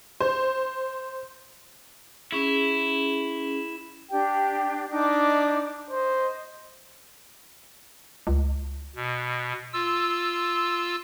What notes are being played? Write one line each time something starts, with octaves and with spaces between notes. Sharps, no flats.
C5
C#4 E4 G#4
D4 G4 G5
D4 D#4 D6
C5 D#5
C#2
B2
F4 E6